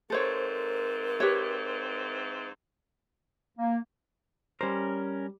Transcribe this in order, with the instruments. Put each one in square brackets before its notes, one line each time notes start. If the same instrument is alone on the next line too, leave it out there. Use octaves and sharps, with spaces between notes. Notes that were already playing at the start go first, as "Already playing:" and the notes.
[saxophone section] G#2 E3 C4 [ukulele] A4 C5 C#5 [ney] A#4
[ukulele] G4 B4 C#5
[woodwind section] A#3
[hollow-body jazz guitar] G3 C5 [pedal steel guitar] C#4 A#4